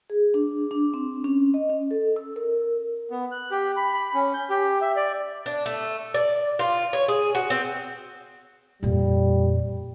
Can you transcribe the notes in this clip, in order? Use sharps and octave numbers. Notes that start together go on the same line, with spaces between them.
G#4
D4
D4
C4
C#4
D#5
C#4
A4
E6
A#4
B3
F#6
G4
B5
B5
C#4
G6
G4
E5
D5
D4
A3
D5
F4
C#5
G#4
F#4
C4
F2 A#2 G3